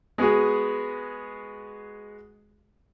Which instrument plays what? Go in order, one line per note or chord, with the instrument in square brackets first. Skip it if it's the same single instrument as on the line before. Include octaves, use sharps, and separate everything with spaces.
[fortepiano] G#3 B3 F#4 G#4